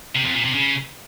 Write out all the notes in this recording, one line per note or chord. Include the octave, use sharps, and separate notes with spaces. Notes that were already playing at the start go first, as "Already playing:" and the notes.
C3
F2
A#2
C3
C#3